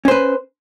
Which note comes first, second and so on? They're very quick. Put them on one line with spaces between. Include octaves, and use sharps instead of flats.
C#4 C5 B4